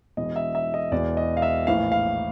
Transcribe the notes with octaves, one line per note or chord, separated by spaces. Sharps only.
E1 E2 B2 D#5
E5
E5
D#5
E1 E2 B2 D5
D#5
F5
E5
A#1 A2 E3 F5
F5